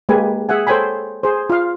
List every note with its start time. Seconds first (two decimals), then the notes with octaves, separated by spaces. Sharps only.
0.09 G#3 A#3 G4 B4 G#5
0.49 G#4 E5 F#5 G#5
0.67 A4 C5 C#5 G5 G#5 B5
1.23 G#4 C5
1.50 F4 F5